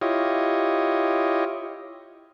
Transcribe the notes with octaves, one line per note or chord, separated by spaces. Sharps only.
E4 F4 G4 C#5 D#5